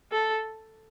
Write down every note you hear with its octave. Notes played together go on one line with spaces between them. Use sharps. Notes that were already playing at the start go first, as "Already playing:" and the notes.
A4